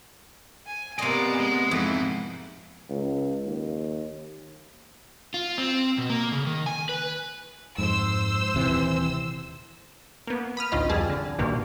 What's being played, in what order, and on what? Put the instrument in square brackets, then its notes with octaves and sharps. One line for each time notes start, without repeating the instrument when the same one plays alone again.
[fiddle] G#5
[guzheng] C3 D#5 [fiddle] A#3 D5 [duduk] B3 [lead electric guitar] G#5 C6
[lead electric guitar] G#3
[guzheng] F2 [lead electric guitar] G#2 [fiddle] E4
[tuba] C#2
D#2
[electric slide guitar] F4
C4
B2
A#3
C#3
D#3
G#5
B4
[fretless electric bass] F2 G#2 [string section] C5 E6
[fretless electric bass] D#1 C3 E3
[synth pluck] A#3 B3
B5 D#6 F6
A1 D2 D#3 F4 D#5 B5
F2 G3 G#4 A5
D3
A#1 G2 B2 D#3 A#3